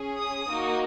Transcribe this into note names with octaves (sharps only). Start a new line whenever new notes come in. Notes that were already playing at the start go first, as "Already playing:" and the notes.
Already playing: C#4 G#4
D#6
A#3 D#4 F#4